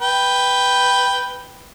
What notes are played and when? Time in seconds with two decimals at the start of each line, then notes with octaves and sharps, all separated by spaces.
0.01 B4 G5